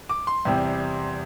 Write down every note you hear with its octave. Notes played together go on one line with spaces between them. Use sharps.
D6
C6
E2 C3 G3 C4